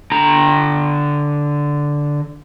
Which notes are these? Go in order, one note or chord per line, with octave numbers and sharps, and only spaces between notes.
D3 A#5